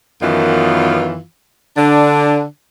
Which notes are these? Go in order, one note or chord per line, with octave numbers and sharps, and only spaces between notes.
F#2 D#3 E3 B3 F4
D3 D4